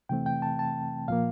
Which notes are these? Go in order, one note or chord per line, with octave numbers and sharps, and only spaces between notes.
C3 E3 A3 C4 G5
G5
A5
A5
A#2 F3 A#3 F5